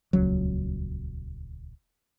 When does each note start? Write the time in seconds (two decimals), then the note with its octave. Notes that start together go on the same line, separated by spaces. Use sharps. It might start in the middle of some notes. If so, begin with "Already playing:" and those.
0.13 D#1 C#2 F#3